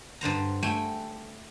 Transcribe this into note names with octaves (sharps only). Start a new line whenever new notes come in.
G2 D3 C5 A#5
A3 G5 G#5